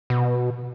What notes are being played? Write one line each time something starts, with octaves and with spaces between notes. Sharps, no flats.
B2